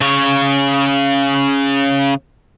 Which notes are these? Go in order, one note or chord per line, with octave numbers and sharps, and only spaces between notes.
C#3 C#5